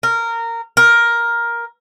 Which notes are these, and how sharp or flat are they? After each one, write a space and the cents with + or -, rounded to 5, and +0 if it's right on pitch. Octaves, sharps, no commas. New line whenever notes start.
A#4 -15
A#4 +10